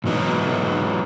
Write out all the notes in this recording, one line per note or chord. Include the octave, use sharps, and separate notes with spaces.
G#2 E3 F#3 B3 D#4